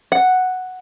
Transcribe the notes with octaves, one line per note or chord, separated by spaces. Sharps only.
F#5